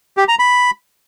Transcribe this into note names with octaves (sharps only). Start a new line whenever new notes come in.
G4
A#5
B5